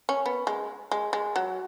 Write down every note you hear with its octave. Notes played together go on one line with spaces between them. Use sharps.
C#4
B3
G#3
G#3
G#3
F#3